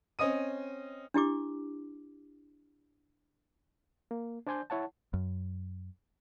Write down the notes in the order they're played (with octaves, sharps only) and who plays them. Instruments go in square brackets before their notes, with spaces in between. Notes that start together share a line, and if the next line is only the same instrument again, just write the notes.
[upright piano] C4 C#4 D#5 D#6 D#7
[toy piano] D4 E4 G4 D6
[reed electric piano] A#3
D4 C5 D5 G#5 C6 G6
E4 C#5 F#5 A5
[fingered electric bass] F#2